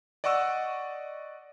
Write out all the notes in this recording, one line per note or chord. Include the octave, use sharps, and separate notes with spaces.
D5 D#5 F#5 C#6 E6